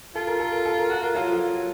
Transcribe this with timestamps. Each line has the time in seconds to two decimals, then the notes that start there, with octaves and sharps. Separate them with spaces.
0.15 F4 A4
0.27 A#4
0.40 A4
0.52 A#4
0.65 A4
0.79 A#4
0.90 F#4 A4
1.02 F4 A#4
1.16 F#3 F4 A4
1.28 F3
1.40 F#3
1.53 F#3